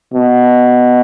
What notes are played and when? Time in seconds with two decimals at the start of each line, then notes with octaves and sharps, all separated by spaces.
0.14 B2